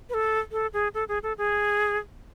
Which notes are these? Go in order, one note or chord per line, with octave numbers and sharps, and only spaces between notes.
B4
A4
A4
G#4
A4
G#4
A4
G#4